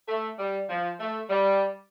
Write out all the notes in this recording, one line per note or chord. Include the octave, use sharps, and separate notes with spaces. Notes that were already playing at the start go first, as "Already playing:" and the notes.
A3
G3
F3
A3
G3